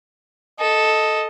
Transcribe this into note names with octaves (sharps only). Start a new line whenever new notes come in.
A4 D#5